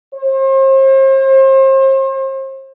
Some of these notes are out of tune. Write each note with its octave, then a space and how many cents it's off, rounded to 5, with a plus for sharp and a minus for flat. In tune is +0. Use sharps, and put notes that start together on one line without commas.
C5 +40